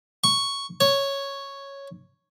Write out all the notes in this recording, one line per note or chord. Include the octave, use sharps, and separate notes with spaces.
C#6
C#5